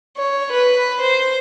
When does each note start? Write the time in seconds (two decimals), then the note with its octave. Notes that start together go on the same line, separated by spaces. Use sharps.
0.17 C#5
0.51 B4
1.01 C5